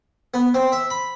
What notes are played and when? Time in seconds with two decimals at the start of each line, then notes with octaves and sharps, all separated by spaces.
0.34 B3
0.54 C4
0.72 E5
0.90 B5